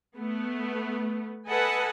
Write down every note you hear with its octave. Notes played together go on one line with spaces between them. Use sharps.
A3 B3
A4 B4 D#5 F#5 G#5 A5